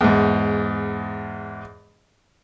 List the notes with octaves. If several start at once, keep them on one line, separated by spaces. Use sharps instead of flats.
E2 G#2